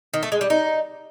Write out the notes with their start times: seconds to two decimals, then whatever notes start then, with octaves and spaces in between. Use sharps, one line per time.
0.14 D#3
0.23 A3
0.32 G#3
0.41 G3
0.50 D#4